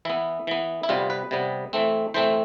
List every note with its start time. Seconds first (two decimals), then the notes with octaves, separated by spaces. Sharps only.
0.05 E3 B3 E4
0.47 E3 B3
0.83 E4
0.89 C3 G3 B3 F4
1.10 B4
1.31 C3 G3 B3
1.73 E3 A3 C4
2.14 E3 A3 C4 C5